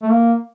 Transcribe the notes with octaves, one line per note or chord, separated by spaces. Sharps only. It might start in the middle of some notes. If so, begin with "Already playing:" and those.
A3
A#3